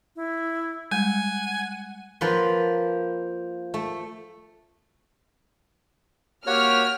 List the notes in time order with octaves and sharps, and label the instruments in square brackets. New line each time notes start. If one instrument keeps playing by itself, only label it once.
[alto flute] E4
[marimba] G3 G#3 [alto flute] F#5 [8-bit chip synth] G#5
[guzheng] F3 A#3 B4 C6
A3
[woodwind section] A#3 G4 [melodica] F#4 [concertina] C#5 [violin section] F6